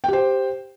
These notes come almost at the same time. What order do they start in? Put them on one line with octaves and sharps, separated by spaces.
G5 G4 C5